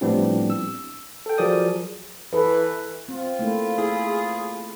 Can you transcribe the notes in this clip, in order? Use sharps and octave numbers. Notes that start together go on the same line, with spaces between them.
A2 F3 G3 B3 C4 D4
E6
A4 G5
F3 F#3 G#4 A#4 D5 D#6
E3 A4 B4
C4 F4
A3 A#3 E4
E4 G#4